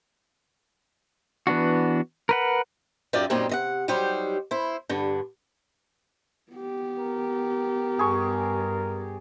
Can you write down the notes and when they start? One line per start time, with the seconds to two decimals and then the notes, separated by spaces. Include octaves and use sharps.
1.47 E3 B3 D4 F#4
2.29 A#4 B4 F#5
3.13 F#2 D#4 F4 G4 D5 E5
3.30 F#2 A#2 G3 A#3 C4 D#4
3.49 C3 D#5 F#5
3.88 F#3 G3 D#4 G4 C5
4.51 E4 C5
4.89 G2 D3
6.52 B3 G4
6.99 A#4
7.99 G2 G#4 C#6